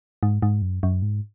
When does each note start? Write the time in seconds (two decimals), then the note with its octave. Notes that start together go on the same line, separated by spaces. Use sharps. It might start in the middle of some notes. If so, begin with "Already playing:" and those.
0.23 G#2
0.42 G#2
0.62 F#2
0.83 F#2
1.02 G#2